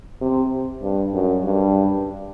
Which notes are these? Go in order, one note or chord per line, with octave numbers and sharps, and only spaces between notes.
C3
G2
F#2
G2